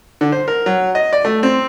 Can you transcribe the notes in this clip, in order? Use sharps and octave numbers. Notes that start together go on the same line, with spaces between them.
D3
C5
A#4
F#3
D#5
D5
A3
C4